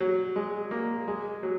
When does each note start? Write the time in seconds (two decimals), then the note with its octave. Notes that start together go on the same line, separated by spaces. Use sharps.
0.01 F#3
0.36 G#3
0.71 A#3
1.08 G#3
1.43 F#3